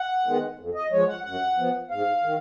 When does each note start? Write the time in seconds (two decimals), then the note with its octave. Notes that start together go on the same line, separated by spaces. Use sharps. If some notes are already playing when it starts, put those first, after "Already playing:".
Already playing: F#5
0.25 D#3 G#3 B3
0.59 F2
0.75 D#5
0.92 F3 G#3 C#5
1.08 F#5
1.24 F#2 F#5
1.57 F3 B3
1.90 G#2 F5
2.23 D#3